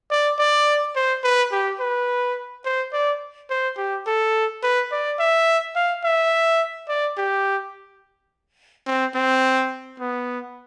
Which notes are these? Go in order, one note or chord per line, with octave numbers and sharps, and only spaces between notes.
D5
D5
C5
B4
G4
B4
C5
D5
C5
G4
A4
B4
D5
E5
F5
E5
D5
G4
C4
C4
B3